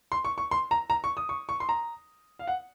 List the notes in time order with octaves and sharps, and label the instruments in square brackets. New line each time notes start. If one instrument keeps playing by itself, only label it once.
[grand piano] C6
C#6
C#6
C6
A#5
A#5
C#6
D#6
C#6
C#6
C6
A#5
F5
F#5